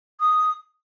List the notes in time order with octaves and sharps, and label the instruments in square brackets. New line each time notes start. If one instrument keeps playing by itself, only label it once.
[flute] D#6